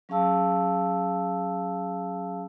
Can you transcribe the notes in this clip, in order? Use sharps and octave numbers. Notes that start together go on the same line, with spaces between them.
F#3 C#4 G#4 F5 A5 E6